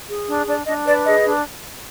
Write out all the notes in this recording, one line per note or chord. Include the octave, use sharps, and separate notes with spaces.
G#4
D4
D4 D5
D4 D#5
B4 D5
G#4 D#5
D4